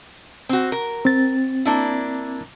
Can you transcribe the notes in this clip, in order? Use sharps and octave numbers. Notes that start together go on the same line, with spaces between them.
C4 F#4
A#4
C4 A6
A#3 D4 E4